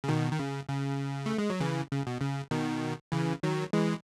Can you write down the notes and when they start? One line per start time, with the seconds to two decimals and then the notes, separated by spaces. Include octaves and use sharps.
0.04 C#3
0.08 B2 D#3
0.32 D#3
0.39 C#3
0.69 C#3
1.26 A3
1.38 G#3
1.50 F#3
1.60 C#3 E3
1.92 C#3
2.07 B2
2.21 C#3
2.51 B2 D#3
3.12 C#3 E3
3.43 D#3 F#3
3.73 E3 G#3